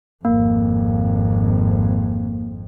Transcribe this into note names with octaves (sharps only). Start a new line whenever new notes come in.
G#1 F2 A#3